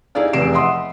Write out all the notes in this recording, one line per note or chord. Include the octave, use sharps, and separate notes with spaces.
D#4 E4 G4 G#4 D5 F5
F1 E2 C3 C7 D7 E7
D#5 E5 F#5 B5 C6 D#6